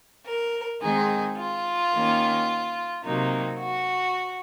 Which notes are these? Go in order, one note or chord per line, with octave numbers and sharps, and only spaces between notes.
A#4
D#3 G#3 C4 D#4 G#4
F4
D#3 A#3 C#4
C3 F#3 A#3 D#4
F#4